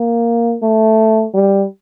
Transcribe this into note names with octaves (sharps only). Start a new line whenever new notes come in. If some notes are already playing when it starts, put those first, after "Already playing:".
Already playing: A#3
A3
G3